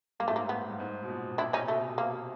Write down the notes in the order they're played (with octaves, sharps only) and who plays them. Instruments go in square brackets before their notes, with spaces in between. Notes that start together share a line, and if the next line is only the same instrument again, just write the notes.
[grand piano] G2 [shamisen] A#3
[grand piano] A2 [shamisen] A3
[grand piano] G#2 [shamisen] A#3
[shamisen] B3
[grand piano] G2
G#2
B2
A#2
[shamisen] D4 E4
C#4 D#4
[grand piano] C3
[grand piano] B2 [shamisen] A3
[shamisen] A#3